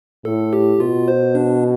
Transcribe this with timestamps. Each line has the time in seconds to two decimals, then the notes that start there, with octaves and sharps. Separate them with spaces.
0.25 A2 A4
0.53 G4
0.80 B2 F4
1.08 C5
1.35 D4